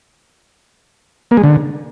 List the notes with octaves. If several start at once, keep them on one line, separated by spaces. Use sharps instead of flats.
A#3
G#3
D3